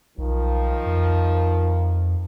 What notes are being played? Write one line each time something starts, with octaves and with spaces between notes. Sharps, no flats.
B1 D#3 F3
F2